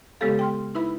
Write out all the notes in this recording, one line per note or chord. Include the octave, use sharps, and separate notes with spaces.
C#3 G#3 B3 G4 A4 F5
G5 C6 F6
D#4 E4 B4 E5 B5